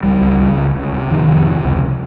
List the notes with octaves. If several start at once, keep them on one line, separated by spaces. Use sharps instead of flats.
C#2 G3
C#2
C#3
C#2
C#2
C3
F2 D#3
F2
C3
C#2